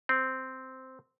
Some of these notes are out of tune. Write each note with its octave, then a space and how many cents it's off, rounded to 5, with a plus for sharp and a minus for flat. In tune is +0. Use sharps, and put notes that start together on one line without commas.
C4 -5